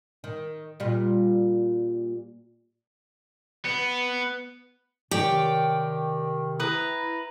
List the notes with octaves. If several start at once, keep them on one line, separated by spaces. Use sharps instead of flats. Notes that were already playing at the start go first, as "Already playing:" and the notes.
D#3
A#2 G3 F4
B3
C3 D#3 G4 C#5 D5 G5
E4 B4 A#5 D#6